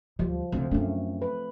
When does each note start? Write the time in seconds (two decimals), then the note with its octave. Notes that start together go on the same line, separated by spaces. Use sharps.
0.19 D2 F3 G3
0.52 D2 C#3 C4
0.71 F#2 A3 D4
1.22 B4